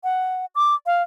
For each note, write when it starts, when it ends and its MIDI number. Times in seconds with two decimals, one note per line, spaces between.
0.04 0.46 78
0.55 0.75 86
0.86 1.02 77